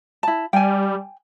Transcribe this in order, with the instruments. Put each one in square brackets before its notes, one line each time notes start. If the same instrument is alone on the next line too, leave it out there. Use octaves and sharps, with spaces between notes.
[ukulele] E4 A5
[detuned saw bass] G3 [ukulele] G5 G#5